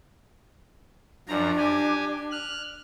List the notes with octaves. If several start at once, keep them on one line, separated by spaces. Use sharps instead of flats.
F#2 F3 D4 A#5
G4 G#5
F6 F#6